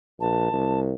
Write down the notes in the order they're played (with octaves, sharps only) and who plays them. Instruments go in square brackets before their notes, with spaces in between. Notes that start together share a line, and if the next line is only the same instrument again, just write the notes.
[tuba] A#1 [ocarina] A5
[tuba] C2